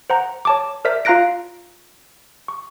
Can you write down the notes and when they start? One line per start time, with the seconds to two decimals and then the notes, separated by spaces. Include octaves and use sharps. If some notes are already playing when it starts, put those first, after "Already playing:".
0.10 C5 F#5 A#5
0.45 C#5 A5 D6
0.85 A#4 C5 D5 E5 B6
1.05 F4 F5 A#5 F#6 A#6 D7
2.48 C#6